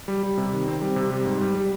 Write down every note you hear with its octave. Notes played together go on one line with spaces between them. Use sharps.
G3
G3
C3
D#3
C4
G3
C3
G3
G#2
G3
G3